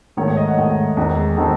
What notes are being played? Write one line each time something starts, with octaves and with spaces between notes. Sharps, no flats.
G#2 D#3 A3 C#5
C#5
D#5
F#5
G#2 D#3 A3
E2 D#3 G#3 C4 D#4
D#3 G#3 C4 D#4 A4